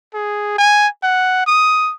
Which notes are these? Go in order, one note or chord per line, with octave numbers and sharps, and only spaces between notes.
G#4
G#5
F#5
D#6